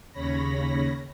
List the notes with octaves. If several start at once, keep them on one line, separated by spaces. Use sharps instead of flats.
D#2 C#3 C#5 B5 A#6